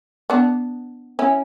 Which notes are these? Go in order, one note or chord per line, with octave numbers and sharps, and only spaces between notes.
B3 D4
C#4 E4